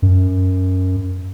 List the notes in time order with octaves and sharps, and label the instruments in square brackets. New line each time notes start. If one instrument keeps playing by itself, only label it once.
[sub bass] F#2